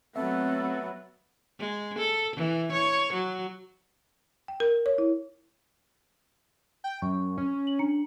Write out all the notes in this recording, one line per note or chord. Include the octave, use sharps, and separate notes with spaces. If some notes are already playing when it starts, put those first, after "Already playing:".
F#3 A3 B3 C4 A4 E5
G#3
A4
E3
C#5
F#3
G5
A#4
C#5
E4
G5
F#2 C#6
C#4
F#7
D4 A#5 C#7